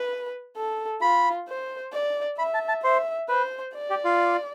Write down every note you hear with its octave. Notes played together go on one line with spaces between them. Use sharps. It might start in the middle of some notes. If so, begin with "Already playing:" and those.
Already playing: B4
A4
F4 B5
C5
D5
E5 B5
A5
A5
C5 E5
B4 C5
D5
G4
F4